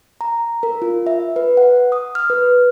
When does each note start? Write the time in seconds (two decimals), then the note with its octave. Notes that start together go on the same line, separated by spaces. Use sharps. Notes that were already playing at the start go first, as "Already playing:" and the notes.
0.21 A#5
0.63 A#4
0.82 F4
1.07 E5
1.36 B4
1.57 F#5
1.92 D#6
2.15 F6
2.30 B4